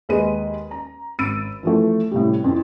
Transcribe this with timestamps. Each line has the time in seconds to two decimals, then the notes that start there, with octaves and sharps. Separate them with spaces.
0.09 D#2 G#3 B4 D#5 D#7
0.71 A#5
1.19 G#1 B5 E6 A6 D7 D#7
1.63 E3 F3 A3
2.11 A2 C3 G3
2.44 F2 C4 E4